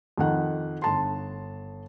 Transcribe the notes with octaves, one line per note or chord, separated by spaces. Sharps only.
F2 D#3 F#5
G1 A5 C6